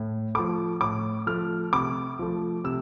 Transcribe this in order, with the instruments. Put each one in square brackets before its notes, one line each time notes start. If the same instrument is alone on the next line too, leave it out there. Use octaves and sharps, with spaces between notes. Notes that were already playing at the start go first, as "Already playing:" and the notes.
Already playing: [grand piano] A2
F3 A3 D6
A2 D6
F3 A3 F6
C3 D6
F3 A3
C3 E6